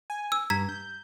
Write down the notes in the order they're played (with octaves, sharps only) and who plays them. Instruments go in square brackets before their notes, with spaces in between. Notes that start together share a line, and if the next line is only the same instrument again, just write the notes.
[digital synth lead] G#5
[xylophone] E6
[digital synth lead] G2 [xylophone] A#5 G#6 B6
[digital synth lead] G6